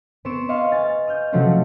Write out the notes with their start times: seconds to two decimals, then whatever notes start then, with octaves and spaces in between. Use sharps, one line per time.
0.25 B3 C4 C6 C#6 D7 E7
0.48 B4 D#5 F5 C6 C#6 F6
0.72 G#5 F6 A6
1.08 D#6 F6 G6
1.32 C3 F3 F#3 A3 C4 C#4